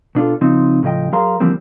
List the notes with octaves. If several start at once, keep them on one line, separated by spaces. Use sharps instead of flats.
B2 D4 F4 A4
C#3 F3 C4 D#4
A2 C#3 F3 D#5 G5
F#3 G#4 A#4 F5 A#5 C6
D3 E3 F3 G3 A#3 C4